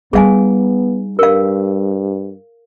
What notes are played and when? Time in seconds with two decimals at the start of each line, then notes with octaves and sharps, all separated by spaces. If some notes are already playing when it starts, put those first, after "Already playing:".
0.13 G3 B3 D#4 G#4 F5 G#5
1.19 G2 A#4 F5